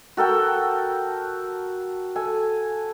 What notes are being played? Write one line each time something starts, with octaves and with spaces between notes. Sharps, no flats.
F#4 A4 A#4 G5
A4 G#5